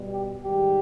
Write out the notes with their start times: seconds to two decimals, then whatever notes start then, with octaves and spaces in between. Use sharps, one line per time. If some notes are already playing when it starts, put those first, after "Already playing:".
Already playing: B2 G3
0.11 G4
0.44 G#2 D#3 G3 G4